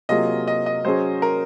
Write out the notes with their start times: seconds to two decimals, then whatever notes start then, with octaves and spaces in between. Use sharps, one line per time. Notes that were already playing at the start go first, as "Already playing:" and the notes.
0.09 C3 F#3 A#3 F4 G#4 D#5
0.48 D#5
0.66 D#5
0.85 F#3 C#4 G#4 C5
1.22 A#4